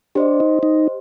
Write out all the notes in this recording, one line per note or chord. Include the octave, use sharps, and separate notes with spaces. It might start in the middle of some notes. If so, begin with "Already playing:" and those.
D4 G4 C5 D#5
D#4
D#4